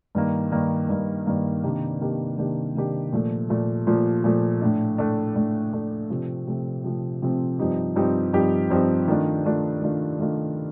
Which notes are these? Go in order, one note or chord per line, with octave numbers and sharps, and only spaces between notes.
G2 D#3 A#3
G2 D#3 A#3
G2 D#3 A#3
G2 D#3 A#3
C3 D#3 A#3 D4 G4
C3 D#3 A#3 D4 G4
C3 D#3 A#3 D4 G4
C3 D#3 A#3 D4 G4
A#2 F3 A3
A#2 F3 A3
A#2 F3 A3
A#2 F3 A3
A2 A3 D4
A2 A3 D4
A2 A3 D4
A2 A3 D4
C3 F3 A3 C4
C3 F3 A3 C4
C3 F3 A3 C4
C3 F3 A3 C4
G2 F3 C4 D#4 G4
G2 F3 C4 D#4 G4
G2 F3 C4 D#4 G4
G2 F3 C4 D#4 G4
D#3 A3 D4 F4
D#3 A3 D4 F4
D#3 A3 D4 F4
D#3 A3 D4 F4